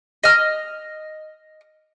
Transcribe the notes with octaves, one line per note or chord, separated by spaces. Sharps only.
D#5 F6